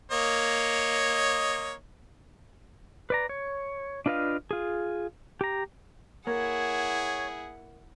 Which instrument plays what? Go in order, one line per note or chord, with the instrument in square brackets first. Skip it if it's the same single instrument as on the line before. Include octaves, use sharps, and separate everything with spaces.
[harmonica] A#3 C#5 D#5
[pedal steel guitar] B4 D5 A#5
C#5
D4 F4 B4 D#5 F5
F4 G#4
G4 A#5
[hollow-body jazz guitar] A#3 [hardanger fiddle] E4 F#5 [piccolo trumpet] G#4 [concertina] C#5